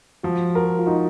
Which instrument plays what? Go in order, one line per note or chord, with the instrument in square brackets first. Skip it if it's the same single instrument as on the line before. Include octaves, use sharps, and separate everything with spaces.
[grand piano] F3 [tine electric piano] F#4
[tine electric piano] F#4 [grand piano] A#4
[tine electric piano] F4
[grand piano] D#4 [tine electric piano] F#4